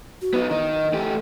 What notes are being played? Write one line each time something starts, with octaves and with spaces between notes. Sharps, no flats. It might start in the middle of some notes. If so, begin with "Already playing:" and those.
F#4
B3 D#4
D#3 D#4 D#5
A3 G4